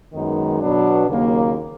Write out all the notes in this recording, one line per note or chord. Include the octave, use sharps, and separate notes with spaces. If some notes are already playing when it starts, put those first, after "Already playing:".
F#2 D#3 G#3 B3 D#4
B2 F#3 B3 D4
D#2 C#3 F#3 A#3